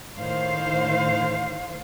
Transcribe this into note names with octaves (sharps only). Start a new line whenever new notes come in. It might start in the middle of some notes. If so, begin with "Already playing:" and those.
A2 D#3 C5 F5